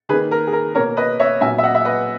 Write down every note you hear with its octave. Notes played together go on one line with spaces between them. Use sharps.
D#3 A#3 G#4 B4
A#4
G#4
A#4
B2 A#3 A#4 C#5
B4 D#5
C#5 E5
A#2 F#3 B3 E5 G#5
E5
D#5 F#5
E5
B4 D#5